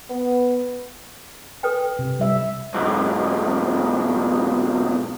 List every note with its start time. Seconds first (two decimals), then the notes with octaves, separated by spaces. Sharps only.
0.10 B3
1.63 A4 B4 G5
1.99 C3
2.19 G3 E5
2.74 B1 G#2